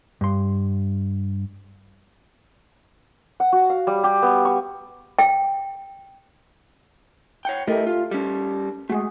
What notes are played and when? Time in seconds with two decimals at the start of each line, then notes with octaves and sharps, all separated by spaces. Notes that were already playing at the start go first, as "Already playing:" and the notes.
0.21 G2 C6
3.40 F#5
3.52 F#4
3.70 F5
3.87 G3
4.04 G4
4.22 B3
4.45 C#6
5.19 G5
7.45 C#5 F#5 G5
7.67 A3 E4 G4 A#4 D#5
7.87 F4
8.11 G3 C#4
8.90 G#3 A3 F#4 G#4